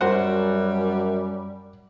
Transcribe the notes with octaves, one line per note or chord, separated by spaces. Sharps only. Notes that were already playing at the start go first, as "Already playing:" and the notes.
F#2 G3 F#4 C5 F#5